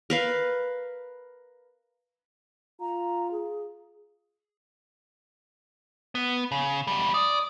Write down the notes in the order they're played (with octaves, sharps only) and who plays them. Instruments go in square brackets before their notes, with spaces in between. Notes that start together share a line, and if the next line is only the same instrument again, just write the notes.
[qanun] A#4 B4 F5
[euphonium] F4 [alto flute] A#5
[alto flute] G#4
[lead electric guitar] B3
C#3
E2 G3
[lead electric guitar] D5 [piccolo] D#6